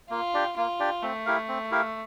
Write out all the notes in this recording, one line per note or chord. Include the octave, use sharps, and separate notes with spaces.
A#3 F4
D4 G4 D5 G5
A#3 F4
D4 G4 D5 G5
A3 C4
E4 G4 A#4 F5
C4
E4 G4 A#4 F5